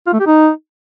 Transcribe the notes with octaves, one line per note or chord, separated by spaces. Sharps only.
F4
A3
G4
D#4